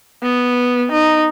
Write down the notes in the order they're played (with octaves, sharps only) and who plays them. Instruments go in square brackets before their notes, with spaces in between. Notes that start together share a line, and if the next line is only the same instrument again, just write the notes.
[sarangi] B3
D#4